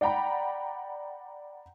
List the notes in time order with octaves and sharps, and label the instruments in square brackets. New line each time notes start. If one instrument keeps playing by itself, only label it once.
[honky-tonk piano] D5 F#5 G5 A#5 B5